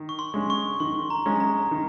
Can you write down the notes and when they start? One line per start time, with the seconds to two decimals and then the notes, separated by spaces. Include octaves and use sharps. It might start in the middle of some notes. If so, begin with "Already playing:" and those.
Already playing: D#3
0.09 C#6
0.19 C6
0.34 G#3 C#4
0.50 C#6
0.80 D#3 C6
1.10 A#5
1.26 G#3 C#4
1.40 A#5
1.71 D#3